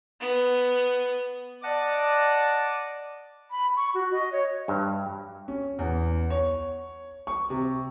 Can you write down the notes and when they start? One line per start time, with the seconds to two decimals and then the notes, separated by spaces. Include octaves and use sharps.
0.21 B3
1.63 D5 D#5 F#5 A5 D6
3.51 B5
3.77 C#6
3.94 F#4
4.12 D#5
4.32 C#5
4.68 G2
5.48 C#4
5.79 E2
6.30 C#5
7.27 C#6
7.50 C3